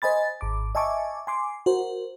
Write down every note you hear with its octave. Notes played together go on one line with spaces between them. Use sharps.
C5 D#5 G#5 B5 A6
G#1 D6
D#5 E5 G#5 A5 C#6 D6
G#5 C6 D6
F#4 A#4 C5